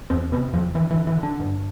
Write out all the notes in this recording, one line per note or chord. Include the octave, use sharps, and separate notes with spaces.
E2 C4
C3 B3
E2 F3
D3 E3
E3
D3
E3
D3
D4
G2